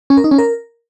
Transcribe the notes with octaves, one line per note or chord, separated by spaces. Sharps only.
C#4
A#4
D#4
C#4
A#4